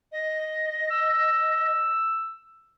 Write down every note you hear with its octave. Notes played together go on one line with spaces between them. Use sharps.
D#5
E6